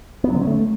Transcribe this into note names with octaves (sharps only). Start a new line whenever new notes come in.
B3
F#3
D3
C#4
A3